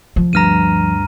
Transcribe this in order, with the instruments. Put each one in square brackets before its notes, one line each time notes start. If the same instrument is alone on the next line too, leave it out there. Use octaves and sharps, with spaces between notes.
[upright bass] F3
[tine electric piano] D2 G2 A#6 [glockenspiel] A#5 F6 D#7